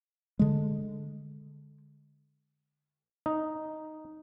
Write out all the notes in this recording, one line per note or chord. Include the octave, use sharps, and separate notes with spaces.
D3 G#3
D#4